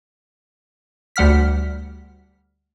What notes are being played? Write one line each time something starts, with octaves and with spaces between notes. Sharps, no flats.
D2 G3 F#5 F6 B6